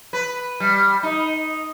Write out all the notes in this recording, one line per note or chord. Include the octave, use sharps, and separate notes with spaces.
B4
G3
D#4